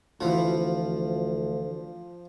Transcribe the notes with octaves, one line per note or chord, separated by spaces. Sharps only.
D2 E3 F3 F#4